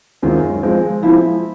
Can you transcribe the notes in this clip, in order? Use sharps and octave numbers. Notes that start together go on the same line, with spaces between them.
F#2 D#3 G#3 C4 F4
F3 G#3 C4
F3 G#3 C4 E4